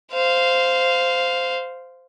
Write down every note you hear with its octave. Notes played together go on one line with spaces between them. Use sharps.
C5 F5